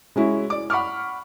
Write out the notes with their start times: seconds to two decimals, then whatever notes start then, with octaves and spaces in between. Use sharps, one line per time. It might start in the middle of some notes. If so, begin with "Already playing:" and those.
0.16 G#3 C#4 E4 F#4
0.50 D5 D6
0.70 F#5 B5 C#6 D6 F6